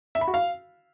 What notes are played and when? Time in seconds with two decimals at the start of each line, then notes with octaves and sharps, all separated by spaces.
0.15 E5
0.21 B5
0.28 F#4
0.34 F5